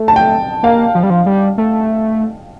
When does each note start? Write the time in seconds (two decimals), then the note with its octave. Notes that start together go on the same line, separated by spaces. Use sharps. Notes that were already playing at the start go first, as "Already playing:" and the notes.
Already playing: A3
0.08 A5
0.16 G5
0.63 A#3 F5
0.95 F3
1.03 G3
1.10 F3
1.26 G3
1.58 A3